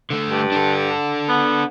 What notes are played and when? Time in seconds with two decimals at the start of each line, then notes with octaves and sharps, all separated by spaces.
0.10 D3 A3
0.29 G2
0.52 D4 A4
1.29 B3